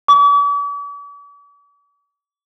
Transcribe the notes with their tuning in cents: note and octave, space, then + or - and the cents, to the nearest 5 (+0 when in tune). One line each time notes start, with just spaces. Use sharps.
D6 -45